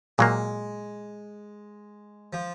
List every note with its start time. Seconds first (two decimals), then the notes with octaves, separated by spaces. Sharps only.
0.18 A#2 F#3 G#3 A#3
2.33 F3